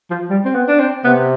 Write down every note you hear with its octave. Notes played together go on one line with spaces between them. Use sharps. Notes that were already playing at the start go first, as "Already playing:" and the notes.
F3
G3
C4
B3
D4
C4
C3 B3